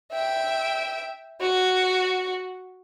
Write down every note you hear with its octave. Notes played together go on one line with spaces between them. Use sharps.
E5 G5
F#4